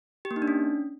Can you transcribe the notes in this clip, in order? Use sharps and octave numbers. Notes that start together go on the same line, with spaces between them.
G4
A#3
D#4
D4
C#4